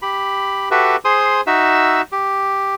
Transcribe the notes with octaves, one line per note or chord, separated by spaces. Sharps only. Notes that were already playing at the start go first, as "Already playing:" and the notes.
G4 B5
F#4 G4 A4 B4 E5
G#4 C5 C6 D#6
D#4 F#4 E5 E6
G4